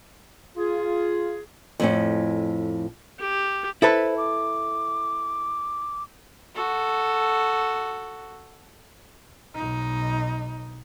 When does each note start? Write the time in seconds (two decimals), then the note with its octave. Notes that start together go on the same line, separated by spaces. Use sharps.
0.57 F4 G#4
1.80 F2 A2 C#4
3.20 G4
3.82 E4 A4 B4 C5
4.17 D6
6.55 F#4 A4
9.55 B1 D#4